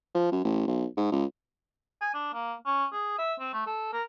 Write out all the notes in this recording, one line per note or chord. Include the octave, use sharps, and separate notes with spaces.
F3
F#2
A1
B1
G#2
C#2
G#5
D4
A#3
C#4
G#4
E5
C4
A3
A4
A#4